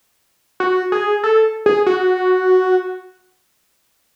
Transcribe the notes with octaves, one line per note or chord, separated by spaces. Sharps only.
F#4
G#4
A4
G#4
F#4